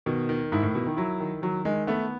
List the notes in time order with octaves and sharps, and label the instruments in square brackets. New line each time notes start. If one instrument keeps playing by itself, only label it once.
[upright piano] B2 [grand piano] D#3
[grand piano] D#3
[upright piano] G#2 [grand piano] E4
[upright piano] A2
[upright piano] B2 [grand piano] E4
[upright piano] D#3
[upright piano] F#3 [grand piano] E4
[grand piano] D#3
[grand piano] D#3 [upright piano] F#3
[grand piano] D#3 [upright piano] G#3
[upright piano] A3 [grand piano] B3